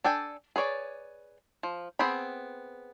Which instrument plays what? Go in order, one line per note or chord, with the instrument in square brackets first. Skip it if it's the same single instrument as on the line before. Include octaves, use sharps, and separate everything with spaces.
[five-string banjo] D4 A4 G5 G#5
G#4 B4 C#5 D5
F3
B3 C4 G#4 G5 B5